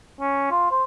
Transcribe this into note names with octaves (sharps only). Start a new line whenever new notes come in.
C#4
F4
C5